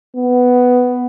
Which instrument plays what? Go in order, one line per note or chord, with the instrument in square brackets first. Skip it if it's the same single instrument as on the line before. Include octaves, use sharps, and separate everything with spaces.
[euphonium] B3